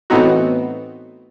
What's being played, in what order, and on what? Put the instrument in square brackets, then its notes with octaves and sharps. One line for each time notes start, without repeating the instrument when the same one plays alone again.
[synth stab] A2 E3 B3 C4 D#4 F#4